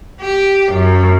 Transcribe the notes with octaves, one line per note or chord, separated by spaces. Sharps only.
G4
F#2